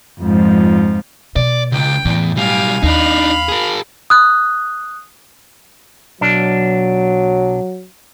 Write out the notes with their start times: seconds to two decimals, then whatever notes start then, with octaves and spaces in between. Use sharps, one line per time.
0.20 F2 G#2 F3
1.36 B2 D5
1.72 C#2 G5
2.05 E2 A2
2.37 B1 G3 F5 G#5
2.83 D#2 D4 D#4 F5 B5
3.49 G#4 A#4
4.10 D#6 F#6
6.21 B1 F#3 D4